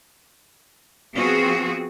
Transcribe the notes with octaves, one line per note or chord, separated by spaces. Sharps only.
F3 B3 C4 F#4 G#4